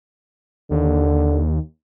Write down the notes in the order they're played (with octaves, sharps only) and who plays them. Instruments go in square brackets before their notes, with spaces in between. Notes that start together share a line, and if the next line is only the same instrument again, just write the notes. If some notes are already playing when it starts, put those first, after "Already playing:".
[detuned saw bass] D#2 [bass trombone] D3